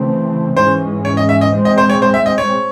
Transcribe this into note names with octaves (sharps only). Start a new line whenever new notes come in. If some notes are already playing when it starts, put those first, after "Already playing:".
Already playing: C#3 E3 A3 C4
G#2 E3 G#3 C#4 C5
C#5
D#5
E5
D#5
A2 G#3 C4
D#5
C5
C#5
C5
E5
D#5
C#5